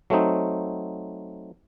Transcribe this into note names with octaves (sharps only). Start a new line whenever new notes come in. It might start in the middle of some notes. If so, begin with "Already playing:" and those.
F#3 A3 C4 D#4